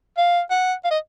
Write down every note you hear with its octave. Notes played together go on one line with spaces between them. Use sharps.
F5
F#5
F5
D#5